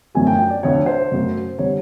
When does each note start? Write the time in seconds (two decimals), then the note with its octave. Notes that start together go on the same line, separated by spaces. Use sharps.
0.15 F#2 D3 F3 A3 G#5
0.27 G5
0.38 G5
0.50 D5
0.63 D2 D3 F3 C#5
0.86 C5
1.10 F#2 C#3 F#3 A3
1.59 D3 G3 C#5